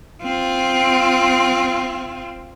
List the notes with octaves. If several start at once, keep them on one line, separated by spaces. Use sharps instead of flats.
C4 F4